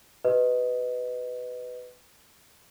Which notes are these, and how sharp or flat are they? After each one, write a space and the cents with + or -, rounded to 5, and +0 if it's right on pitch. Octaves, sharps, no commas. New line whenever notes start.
G4 -30 B4 +15 D#5 +0